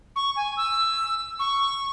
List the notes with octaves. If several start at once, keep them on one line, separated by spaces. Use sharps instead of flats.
C#6
G#5
E6
C#6